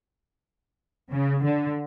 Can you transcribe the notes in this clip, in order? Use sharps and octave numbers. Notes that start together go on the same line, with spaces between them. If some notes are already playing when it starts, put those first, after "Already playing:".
C#3
D3